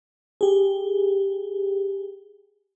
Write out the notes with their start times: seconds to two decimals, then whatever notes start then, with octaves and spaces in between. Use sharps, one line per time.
0.41 G4 G#4